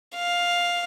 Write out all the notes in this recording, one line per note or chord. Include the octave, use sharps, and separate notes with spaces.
F5